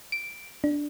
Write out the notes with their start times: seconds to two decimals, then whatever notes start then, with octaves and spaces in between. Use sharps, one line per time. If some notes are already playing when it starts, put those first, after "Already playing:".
0.12 D7
0.64 D4